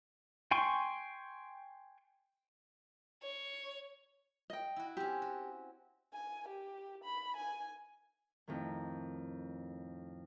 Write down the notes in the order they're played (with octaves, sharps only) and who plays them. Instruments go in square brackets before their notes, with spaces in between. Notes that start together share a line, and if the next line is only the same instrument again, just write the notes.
[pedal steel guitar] G5 G#5 C6 C#6
[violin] C#5
[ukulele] D#5 G5
[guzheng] E4 F#4
[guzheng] C4 C#4 [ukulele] G4
[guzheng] F#4
[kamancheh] G#5
G4
B5
G#5
[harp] F2 A2 D#3